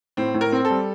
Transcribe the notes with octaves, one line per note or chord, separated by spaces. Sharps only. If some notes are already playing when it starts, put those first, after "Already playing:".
A2 C4
A2
A#4
C4
A4
G3